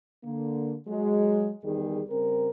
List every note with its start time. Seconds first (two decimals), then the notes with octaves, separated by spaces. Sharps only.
0.23 D3 A#3
0.88 F#3 G#3
1.63 E2 D#3 G3 G#4
2.08 C#3 G3 C4 A#4